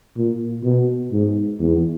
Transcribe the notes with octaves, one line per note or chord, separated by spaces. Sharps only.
A#2
B2
G#2
E2